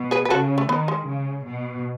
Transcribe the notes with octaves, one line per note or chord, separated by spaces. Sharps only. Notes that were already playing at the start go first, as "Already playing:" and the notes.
Already playing: B2
G#4 B4
B4
C#3 F#4 A4
A3
D#3 B3
G#3
C#3
B2